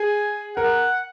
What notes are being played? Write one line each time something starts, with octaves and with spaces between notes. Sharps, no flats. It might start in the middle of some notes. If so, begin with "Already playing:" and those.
Already playing: G#4 G#5
A#4 F#5